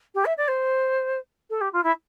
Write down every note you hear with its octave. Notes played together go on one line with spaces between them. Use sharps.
G4
E5
D5
C5
A4
G4
F4
E4